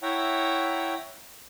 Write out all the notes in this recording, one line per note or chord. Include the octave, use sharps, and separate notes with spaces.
E4 C#5 E5 F#5 G5 A#5